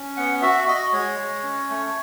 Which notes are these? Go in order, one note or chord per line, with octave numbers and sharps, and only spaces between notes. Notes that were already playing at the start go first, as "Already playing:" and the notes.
Already playing: C#4
B3 F#5
F#4 E5
F#4 D#5
G#3 C#5
G#3
C#4
A3